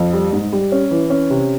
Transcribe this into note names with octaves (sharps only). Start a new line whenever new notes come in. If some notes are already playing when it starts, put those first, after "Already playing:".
Already playing: F2
G3
G#2
G3
C#4
E3
C#4
C3